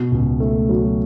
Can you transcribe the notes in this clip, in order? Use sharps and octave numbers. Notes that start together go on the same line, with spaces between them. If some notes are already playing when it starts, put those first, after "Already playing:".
Already playing: B2
C#2
A3
F#3